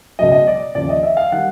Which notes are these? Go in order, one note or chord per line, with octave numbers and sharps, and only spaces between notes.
C#2 B2 F#3 D#5
D#5
D5
D#2 C#3 F3 D5
D#5
E5
F5
D#3 G3 F#5